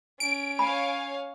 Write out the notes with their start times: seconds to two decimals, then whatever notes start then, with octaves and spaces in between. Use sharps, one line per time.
0.20 C#4 D7
0.59 C#5 F5 G#5 B5